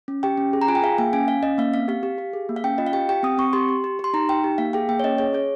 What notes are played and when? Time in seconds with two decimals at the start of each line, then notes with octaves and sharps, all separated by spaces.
0.08 C#4
0.23 G4 G5
0.38 C#4
0.53 G#4
0.62 A#5
0.68 F4 G#5
0.75 G5
0.83 G#4 F5
0.98 A#3 G5
1.13 C#4 G#5
1.28 C#4 F5
1.43 C#4 D#5
1.58 A#3 F5
1.73 C4 F5
1.88 G4 F5
2.03 G4
2.18 G4
2.33 G#4
2.49 A#3
2.56 F5
2.64 C#4 G5
2.78 F4 D#5
2.87 F5
2.93 G4 G5
3.09 G4 G5
3.23 C4 D#6
3.38 C4 C#6
3.53 G4 C6
3.69 G4
3.84 G4
3.99 G4 C6
4.14 D#4 A#5
4.29 D#4 G5
4.44 G4
4.58 A#3 F5
4.73 G#4 G5
4.89 A#3 G5
5.00 C#5
5.04 C#4 D#5
5.18 G#4 C#5
5.33 G#4 C#5